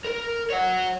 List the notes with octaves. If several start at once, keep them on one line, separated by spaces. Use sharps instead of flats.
A#4
C#5 F#5